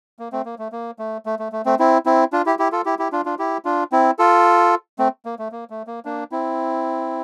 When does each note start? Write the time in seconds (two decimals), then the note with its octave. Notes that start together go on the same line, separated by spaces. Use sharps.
0.19 A#3
0.32 A3 C4
0.46 A#3
0.59 A3
0.72 A#3
0.99 A3
1.26 A3
1.39 A3
1.52 A3
1.66 A3 C4
1.79 C4 E4
2.06 C4 E4
2.33 D4 F4
2.46 E4 G4
2.59 E4 G4
2.72 F4 A4
2.85 E4 G4
2.99 E4 G4
3.12 D4 F4
3.25 D4 F4
3.39 E4 G4
3.65 D4 F4
3.92 C4 E4
4.19 F4 A4
4.99 A3 C4
5.25 A#3
5.39 A3
5.52 A#3
5.70 A3
5.87 A#3
6.05 A#3 D4
6.32 C4 E4